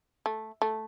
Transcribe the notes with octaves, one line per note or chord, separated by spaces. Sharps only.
A3
A3